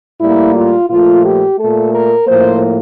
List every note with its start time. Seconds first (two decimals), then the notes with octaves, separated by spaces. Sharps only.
0.20 A2 G3 A#3 E4
0.55 F4
0.89 A#2 F3 A3 F4
1.24 G4
1.59 A#2 A3 A4
1.94 A#4
2.27 A2 F3 A#3 C5